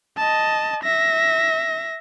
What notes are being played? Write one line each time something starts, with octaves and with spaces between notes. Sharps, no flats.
D#5 A5
E5 A#6